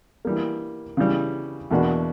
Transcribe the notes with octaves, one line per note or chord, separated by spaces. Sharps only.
E3 G3 A#3
C#3 E3 G3
E2 B2 A#3 D4 F#4